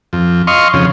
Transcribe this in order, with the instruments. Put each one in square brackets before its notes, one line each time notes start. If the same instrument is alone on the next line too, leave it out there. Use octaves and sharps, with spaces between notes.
[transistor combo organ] F2
D#5 F5 C6 C#6
F2 C#3